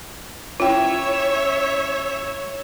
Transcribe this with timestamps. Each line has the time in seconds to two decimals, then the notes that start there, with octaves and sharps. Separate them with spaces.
0.60 C#4 E4 F4 C#5 E5 G5